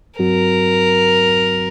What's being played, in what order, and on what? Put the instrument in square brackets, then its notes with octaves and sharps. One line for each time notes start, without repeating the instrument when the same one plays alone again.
[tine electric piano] G2 F#3 C4 F#4 [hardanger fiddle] A#4